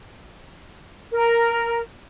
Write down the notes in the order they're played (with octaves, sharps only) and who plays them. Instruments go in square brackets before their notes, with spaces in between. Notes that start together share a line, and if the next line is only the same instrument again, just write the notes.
[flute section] A#4